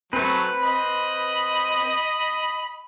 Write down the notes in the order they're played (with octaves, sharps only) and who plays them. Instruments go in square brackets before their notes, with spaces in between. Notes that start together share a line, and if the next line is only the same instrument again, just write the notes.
[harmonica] F#3 A3 [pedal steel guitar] C4 B4
[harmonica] D#5 B5